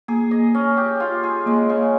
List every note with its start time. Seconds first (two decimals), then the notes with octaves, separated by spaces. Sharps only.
0.08 A#3 G#4
0.31 D#5
0.55 C#4
0.77 G4
1.00 F4
1.23 G#4
1.46 G#3 A#3
1.70 C#3